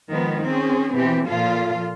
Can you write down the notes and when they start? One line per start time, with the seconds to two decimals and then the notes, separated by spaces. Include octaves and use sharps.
0.10 D#3 F3 G#3 B3
0.43 C4 C#4 G#4
0.94 B2 E3 C4 G4
1.26 A#2 F3 F4 A4 F5